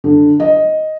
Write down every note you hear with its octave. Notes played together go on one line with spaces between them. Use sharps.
D3
D#5